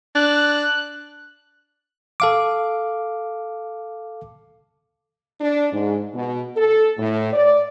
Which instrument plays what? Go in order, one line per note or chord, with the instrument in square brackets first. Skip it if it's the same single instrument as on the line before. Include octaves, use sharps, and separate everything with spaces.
[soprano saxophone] D4 [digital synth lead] F#6
[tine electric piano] A4 F5 D6
[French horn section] D4
G#2
B2
A4
A2
D5